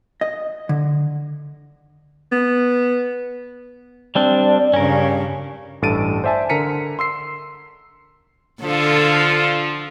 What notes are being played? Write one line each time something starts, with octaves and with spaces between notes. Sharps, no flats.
D#5
D3
B3
G3 C4 D4 D5
G2 C#3 C#4 A#4
A1 G2 A4 A6 D7 D#7
C5 D5 E5 G#5 A5
D3 A#4 A#5 B6 C#7 D#7
C6 E6 C7
D3 F3 F4 A4